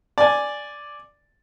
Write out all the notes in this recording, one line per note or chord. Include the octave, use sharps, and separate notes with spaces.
D5 G#5